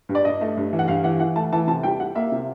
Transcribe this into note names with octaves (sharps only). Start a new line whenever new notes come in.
G2
D5
G2 D#5
A3
G2
E3
F#5
G2 F5
E3 F#5
E3 F#5
A3 A5
E3 A5
C3 A5
G3 G5
G3 F#5
A#3 E5
C3